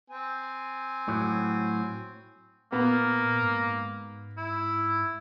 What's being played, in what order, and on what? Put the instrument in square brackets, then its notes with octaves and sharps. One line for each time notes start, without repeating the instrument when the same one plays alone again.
[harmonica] C4 G#5
[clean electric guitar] A2 F#3
[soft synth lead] A#2 [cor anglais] A#3 [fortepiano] B3
[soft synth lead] G#2
[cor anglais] E4